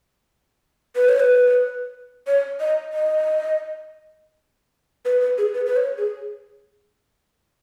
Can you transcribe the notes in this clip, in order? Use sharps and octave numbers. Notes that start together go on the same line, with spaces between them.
B4
C#5
B4
C#5
D#5
D#5
B4
B4
G#4
B4
B4
C#5
G#4